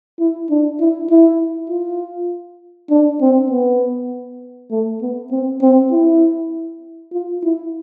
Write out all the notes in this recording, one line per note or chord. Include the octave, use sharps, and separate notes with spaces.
E4
D4
E4
E4
F4
D4
C4
B3
A3
B3
C4
C4
E4
F4
E4